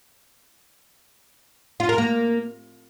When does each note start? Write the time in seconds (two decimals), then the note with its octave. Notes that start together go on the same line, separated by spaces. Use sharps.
1.80 F4
1.89 A#4
1.98 A#3